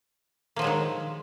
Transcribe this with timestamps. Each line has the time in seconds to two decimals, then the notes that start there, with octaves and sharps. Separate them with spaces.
0.56 A#3
0.59 F3
0.62 F#3
0.64 G#3
0.67 D#3